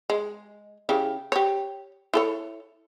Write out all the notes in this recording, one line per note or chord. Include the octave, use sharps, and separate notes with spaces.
G#3
C#3 E4 G4
G4 C#5
E4 A4 C#5